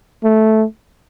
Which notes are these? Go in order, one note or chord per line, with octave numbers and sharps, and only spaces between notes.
A3